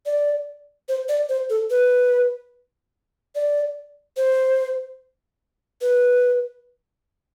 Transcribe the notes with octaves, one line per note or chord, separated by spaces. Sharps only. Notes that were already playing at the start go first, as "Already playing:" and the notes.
D5
C5
D5
C5
A4
B4
D5
C5
B4